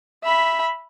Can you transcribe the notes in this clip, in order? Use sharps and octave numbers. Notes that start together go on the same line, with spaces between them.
E5 B5